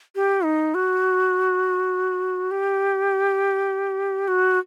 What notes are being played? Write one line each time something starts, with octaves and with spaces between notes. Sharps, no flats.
G4
D#4
F#4
G4
F#4